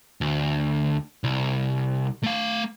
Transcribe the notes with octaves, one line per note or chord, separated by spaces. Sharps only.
D2
C2
A3 F5